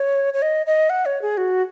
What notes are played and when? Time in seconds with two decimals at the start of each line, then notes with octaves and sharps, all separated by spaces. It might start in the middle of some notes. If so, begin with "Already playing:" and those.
Already playing: C#5
0.34 C#5
0.42 D#5
0.66 D#5
0.90 F#5
1.06 C#5
1.22 G#4
1.37 F#4